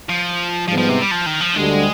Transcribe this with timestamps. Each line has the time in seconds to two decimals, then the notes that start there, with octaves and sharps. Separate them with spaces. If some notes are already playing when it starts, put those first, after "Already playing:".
0.09 F3
0.68 G#2 F3 G3 B3
0.78 F3
0.89 C3
1.01 G3
1.11 F3
1.26 D#3
1.41 F3
1.56 D2 D3 G3 G#3